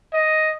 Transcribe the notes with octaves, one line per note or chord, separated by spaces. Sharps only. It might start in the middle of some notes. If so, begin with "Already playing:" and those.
D#5